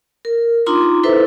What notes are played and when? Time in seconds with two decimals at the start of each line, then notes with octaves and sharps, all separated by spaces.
0.25 A#4
0.66 D4 D#4 F4 A#5 C6 D6
1.03 E4 A4 B4 C5 E5